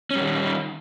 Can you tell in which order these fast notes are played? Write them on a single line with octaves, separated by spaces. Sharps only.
C#4 G3 D#3